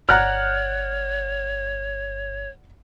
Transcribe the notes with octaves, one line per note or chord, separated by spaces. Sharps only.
G1 C#5 D5 F#5 A#5 F6 F#6